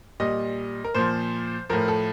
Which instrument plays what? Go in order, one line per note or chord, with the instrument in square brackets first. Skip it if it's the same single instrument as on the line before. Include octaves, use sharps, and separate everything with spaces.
[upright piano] A#2 G3 D#5
A#4
A#2 F3 C5
A2 F3 A#4
A4